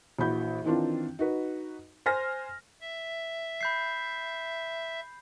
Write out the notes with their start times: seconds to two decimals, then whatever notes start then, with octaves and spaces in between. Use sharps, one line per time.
0.19 A#1 E3 F#4 B5 G6
0.65 D#3 E3 C4 D4 D#4 F4
1.19 D#4 F#4 B4
2.06 C5 G#5 F6 A#6
2.81 E5
3.61 B5 G6 C7